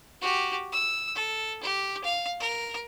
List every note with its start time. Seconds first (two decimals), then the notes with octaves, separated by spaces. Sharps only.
0.22 F#4 G4
0.72 E6
1.15 A4
1.63 G4
2.04 F5
2.40 A#4